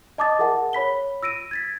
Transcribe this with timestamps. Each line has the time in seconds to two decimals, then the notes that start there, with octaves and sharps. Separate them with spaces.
0.18 D#5 A5 D6 D#6 A6
0.39 G#4 A#4 E5 F#5 A5
0.73 C#5 B5 B6 G7
1.23 E6 A#6 D7 D#7
1.51 G#6 A6 B6